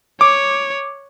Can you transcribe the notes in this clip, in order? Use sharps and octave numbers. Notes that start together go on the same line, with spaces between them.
C#5 D6